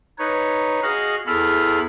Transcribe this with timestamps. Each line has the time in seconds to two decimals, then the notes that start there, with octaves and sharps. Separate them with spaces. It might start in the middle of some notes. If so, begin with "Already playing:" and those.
0.19 D#4 B4 C#5
0.82 F#4 G#4 D#5 F5 F#6
1.27 E2 E4 G#4 A4 B5 F6